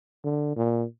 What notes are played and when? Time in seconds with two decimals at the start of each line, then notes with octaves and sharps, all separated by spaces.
0.24 D3
0.56 A#2